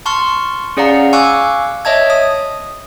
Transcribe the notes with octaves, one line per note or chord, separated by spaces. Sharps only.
A5 C6 C#6 F6
C#4 G#4 D5 F5 F#5 A#5
F5 G#5 C#6 D6 E6 F#6
C#5 D#5 E5 A5 G#6
D#6